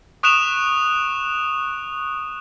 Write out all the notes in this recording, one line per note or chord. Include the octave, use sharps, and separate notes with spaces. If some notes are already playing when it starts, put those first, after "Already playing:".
C#6 D#6 F#6 D7 E7 F7